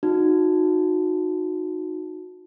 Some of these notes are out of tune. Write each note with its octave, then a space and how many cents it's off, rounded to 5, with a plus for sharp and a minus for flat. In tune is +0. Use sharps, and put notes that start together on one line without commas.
D#4 +0 F#4 -25